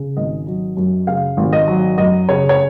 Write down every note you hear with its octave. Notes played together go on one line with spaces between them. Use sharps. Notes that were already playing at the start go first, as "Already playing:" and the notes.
Already playing: C#3
G#1 D#5
F#3
F#2
C#3 F5
G#1
D#5
F#3
F#2 D#5
C#3 C#5
C#5